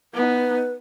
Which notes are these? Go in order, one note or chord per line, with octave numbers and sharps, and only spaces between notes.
B3 D#4 B4